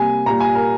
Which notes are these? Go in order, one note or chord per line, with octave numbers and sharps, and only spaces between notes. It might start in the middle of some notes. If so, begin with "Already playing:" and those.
Already playing: C3 G3 A#3 G#5
A#2 G3 A#3 A#5
G#5
A#4